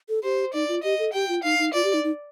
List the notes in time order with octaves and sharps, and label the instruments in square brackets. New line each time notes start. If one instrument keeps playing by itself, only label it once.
[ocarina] A4
[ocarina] G4 [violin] C5
[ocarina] D#4 [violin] D5
[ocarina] F4
[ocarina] G4 [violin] D#5
[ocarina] A4
[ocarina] G4 [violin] G5
[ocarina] F4
[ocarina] D#4 [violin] F5
[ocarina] D#4
[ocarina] F4 [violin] D5
[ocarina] G4
D#4
D#4